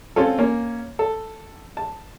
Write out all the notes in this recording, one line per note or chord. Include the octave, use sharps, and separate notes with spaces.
C4 C#4 F4 A4
A#3 C#4
A4
A5